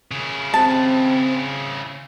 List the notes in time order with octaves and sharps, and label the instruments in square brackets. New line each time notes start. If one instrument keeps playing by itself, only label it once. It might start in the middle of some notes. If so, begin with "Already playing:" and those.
[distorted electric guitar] C#3 E4
[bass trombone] C4 [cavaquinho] A5